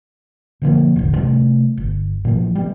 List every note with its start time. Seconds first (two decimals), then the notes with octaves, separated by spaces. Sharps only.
0.62 B2 D3 F3 A#3
0.96 E1 A1 D2
1.16 C3 G3 A3
1.77 G1
2.25 A#2 E3 F3
2.55 G3 B3